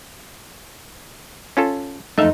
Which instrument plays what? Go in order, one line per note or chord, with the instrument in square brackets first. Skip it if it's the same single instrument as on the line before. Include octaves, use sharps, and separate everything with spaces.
[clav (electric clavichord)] C#4 F4 A4
[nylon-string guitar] F2 D#4 [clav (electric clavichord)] A3 E5 F5